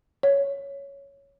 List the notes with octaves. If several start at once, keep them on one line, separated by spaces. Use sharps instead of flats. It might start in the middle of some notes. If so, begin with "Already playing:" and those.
C#5